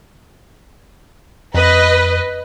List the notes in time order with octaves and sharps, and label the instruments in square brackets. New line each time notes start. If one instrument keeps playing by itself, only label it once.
[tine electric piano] F2 [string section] B4 D#5